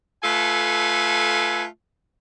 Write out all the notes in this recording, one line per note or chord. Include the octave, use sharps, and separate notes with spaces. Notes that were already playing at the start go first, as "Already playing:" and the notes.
A3 F4 A4 B4 G#5